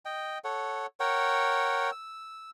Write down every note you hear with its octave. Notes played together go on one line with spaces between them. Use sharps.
D#5 G5
A4 C#5 F#5
A#4 C#5 F#5 G5
E6